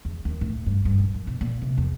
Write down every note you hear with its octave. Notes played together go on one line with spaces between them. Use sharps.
E2
D#2
A2
G2
G2
A#1
F#2
B2
A#2
C3
E2